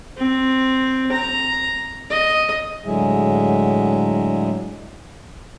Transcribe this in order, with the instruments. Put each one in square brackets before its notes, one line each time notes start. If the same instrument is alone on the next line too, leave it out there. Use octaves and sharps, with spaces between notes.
[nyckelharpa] C4
A#5
D#5
[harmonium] A2 D3 F#3 G#3 G#4 E5